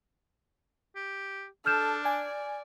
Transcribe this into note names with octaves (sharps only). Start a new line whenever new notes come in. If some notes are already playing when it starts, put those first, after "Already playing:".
G4
D4 A4 F6 G6 E7
D5 G#5